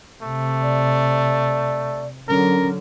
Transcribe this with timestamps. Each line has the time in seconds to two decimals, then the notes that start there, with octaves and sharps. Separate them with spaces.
0.22 C3 A3
0.63 D5
2.29 D3 F#3 C#4 A#4